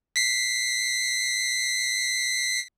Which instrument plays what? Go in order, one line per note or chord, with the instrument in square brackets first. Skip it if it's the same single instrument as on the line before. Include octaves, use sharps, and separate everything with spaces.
[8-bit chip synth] B6 C7